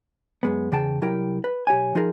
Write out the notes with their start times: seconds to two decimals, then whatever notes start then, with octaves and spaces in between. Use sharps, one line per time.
0.43 F#2 G#3 B3
0.72 E2 C#3 G#4 G5 A5
1.02 C2 F#3 E4 G4 A#4 G5
1.44 B4
1.67 B1 G4 C#5 G#5
1.95 F3 D#4 F4 G#4 A#4